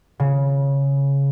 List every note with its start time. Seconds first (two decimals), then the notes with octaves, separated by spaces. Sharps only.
0.20 C#3